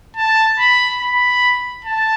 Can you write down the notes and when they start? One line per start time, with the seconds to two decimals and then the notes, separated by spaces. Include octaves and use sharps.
0.17 A5
0.59 B5
1.01 B5
1.85 A5